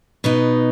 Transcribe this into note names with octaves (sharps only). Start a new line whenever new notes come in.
B2 B3 D#4